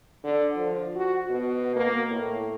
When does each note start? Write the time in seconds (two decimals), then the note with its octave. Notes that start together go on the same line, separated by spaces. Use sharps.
0.24 D3
0.56 F3
0.96 F#4
1.30 B2
1.76 A#3
2.10 A2